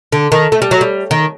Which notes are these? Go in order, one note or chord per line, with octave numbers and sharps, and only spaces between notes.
D3
D#3
A3
G3
F#3
G3
D#3